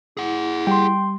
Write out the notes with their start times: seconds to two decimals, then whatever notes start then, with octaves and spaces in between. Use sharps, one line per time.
0.17 E4 G#4 F#5
0.67 G3 G5 C6